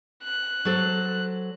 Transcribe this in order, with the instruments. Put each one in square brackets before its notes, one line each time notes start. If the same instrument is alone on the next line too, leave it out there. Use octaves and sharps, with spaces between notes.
[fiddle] F#6
[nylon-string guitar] F#3 A4 C5